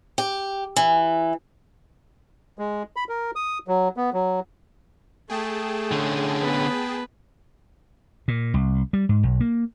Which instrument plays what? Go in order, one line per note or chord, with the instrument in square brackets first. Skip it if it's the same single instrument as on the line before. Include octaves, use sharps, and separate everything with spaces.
[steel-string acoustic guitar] G4
E3
[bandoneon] G#3
B5
A#4
D#6
F#3
B3
F#3
[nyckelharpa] A3 [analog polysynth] G#4 G5 A5
[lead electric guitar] D3 C#4
[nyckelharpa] B3 B4
[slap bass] A#2
C2
G3
G#2
B1
A#3